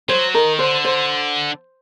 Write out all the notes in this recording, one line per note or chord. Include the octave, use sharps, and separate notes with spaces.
F#3 C5
D#3 A#4
D3 C5
C5